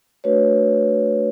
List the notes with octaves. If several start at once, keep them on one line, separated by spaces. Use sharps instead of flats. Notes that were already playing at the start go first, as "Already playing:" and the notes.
A3 D4 F#4 B4 C#5